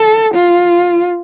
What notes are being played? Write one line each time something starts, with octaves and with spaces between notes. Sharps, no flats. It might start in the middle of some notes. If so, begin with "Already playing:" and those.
Already playing: A4
F4